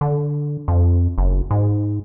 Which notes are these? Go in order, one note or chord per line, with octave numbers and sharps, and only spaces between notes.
D3
F2
F#1
G#2